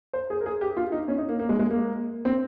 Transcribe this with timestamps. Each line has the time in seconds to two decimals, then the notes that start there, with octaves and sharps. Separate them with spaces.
0.13 C5
0.30 G#4
0.41 A#4
0.46 G#4
0.61 G4
0.77 F4
0.92 D#4
1.08 C#4
1.18 D#4
1.29 A#3
1.40 A#3
1.49 G#3
1.59 G#3
1.71 A#3
2.25 C4